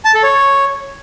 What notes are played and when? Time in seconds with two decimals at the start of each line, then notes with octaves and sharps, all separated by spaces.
0.05 A5
0.14 A4
0.23 C#5